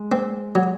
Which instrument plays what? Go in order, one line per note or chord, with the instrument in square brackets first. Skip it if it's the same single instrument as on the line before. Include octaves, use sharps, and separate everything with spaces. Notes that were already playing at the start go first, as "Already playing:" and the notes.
Already playing: [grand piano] G#3
[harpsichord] C4
F#3